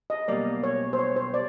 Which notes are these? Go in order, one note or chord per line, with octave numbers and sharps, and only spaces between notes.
D#5
B1 B2 G3 A#3 D5
C#5
C5
C#5
C5
D5